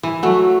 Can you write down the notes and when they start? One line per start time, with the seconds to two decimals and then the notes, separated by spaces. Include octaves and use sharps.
0.03 E3
0.23 F#3 A3